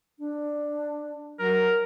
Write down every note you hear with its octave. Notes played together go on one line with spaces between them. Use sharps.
D4
F#3 A#4